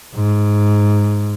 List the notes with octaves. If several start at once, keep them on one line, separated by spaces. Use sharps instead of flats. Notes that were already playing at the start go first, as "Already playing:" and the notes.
G#2